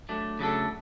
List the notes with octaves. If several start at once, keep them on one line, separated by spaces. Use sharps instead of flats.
F#3 A3 D4
C#3 F#3 A3 D4 A4